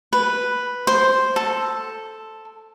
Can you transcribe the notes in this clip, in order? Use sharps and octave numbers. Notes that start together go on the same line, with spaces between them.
B4
C5
A4